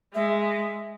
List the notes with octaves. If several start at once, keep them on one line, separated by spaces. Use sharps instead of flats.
G#3 E5